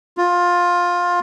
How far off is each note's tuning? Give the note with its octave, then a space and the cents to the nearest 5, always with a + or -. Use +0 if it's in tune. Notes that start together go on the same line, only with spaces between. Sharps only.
F4 +15